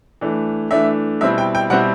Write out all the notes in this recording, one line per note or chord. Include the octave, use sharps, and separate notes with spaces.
E3 A3 D4
E3 A3 D4 E5
B2 G3 C4 E4 E5
G5
G5
B2 G3 C4 E4 F#5